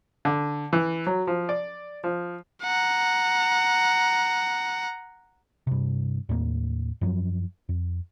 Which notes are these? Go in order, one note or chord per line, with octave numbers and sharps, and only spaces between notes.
D3
E3
F#3
F3
D5
F3
F#5 A#5
G2 C3
D#2 A2 G3 A#3
F#2 F3 F#3
F2